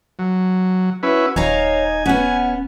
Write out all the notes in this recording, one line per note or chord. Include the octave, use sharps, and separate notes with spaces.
F#3
C#4 E4 F#4 B4
D#1 D#4 C#5 F5 G#5 A#5
B3 C#4 F#5